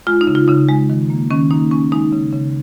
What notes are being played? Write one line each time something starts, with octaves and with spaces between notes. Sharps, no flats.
G#3 F4
D#4
C#3
F4
C#3 D#4
G#3
D#3
A#3
D#3 C#4
A#3 D#4
G#3 C#4
G#3 D#4
C#3
C#3